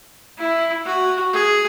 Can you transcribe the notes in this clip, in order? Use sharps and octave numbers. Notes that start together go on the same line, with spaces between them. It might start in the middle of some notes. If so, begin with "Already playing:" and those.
E4
F#4
G#4